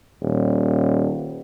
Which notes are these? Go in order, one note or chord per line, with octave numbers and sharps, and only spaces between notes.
D#1